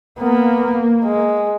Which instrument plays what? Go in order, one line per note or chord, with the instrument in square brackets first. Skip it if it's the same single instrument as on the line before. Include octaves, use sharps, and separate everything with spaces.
[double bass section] A#3 [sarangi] B3
[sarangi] G#3